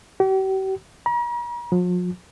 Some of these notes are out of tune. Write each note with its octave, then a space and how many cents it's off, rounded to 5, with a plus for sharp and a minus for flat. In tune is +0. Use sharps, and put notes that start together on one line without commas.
G4 -45
A#5 +45
F3 +45